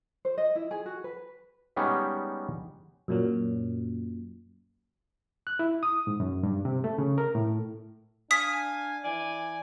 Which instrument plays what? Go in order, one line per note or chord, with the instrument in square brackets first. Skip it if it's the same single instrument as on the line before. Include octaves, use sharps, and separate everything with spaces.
[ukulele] C5
D#5
E4
G#4
F#4
B4
[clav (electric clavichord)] G3 G#3 B3 C#4 D#4 G4
[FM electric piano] F#2 A#2 F#3
[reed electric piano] F#6
E4
D#6
G#2
F#2
G2
C3
A3
C#3
A#4
A2
[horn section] D4 F5 G#5 [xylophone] D#6 B6
[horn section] E3 D5 G#5